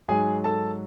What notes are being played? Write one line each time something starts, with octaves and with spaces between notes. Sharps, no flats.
G#2 F#3 G#4 G#5
A4 A5